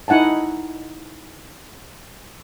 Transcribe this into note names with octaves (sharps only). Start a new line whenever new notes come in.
D#4 E4 F#5 G#5 A5